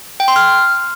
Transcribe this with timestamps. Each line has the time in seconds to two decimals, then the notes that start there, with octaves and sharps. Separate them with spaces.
0.20 G5
0.28 C6
0.36 F6